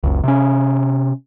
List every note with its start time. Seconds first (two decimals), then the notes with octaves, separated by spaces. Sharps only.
0.04 F#1 C#2
0.24 C3 C#4